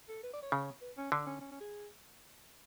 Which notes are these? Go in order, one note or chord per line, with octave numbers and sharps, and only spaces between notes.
A4
B4
D5
C#5
C#3
B4
C#4
D3 D4
C#4
C#4
C#4
G#4